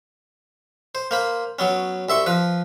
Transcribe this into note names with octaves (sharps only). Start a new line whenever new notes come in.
C5
A#3 C5 B5
F#3 B3 C#4
C2 E5 C6 C#6
F3 B4